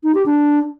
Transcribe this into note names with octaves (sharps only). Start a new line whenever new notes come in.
D#4
G4
D4